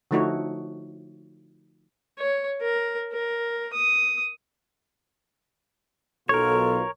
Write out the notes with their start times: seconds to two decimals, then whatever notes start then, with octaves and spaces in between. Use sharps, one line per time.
0.11 D3 F3 A3 D#4 F#4 C#5
2.18 C#5
2.62 A#4
3.12 A#4
3.73 D#6
6.29 B1 B2 F4 A4 A#4 C#5